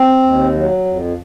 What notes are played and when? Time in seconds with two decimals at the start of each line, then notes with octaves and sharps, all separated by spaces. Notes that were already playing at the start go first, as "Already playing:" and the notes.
Already playing: C4
0.23 D#2
0.54 F#3
0.86 F2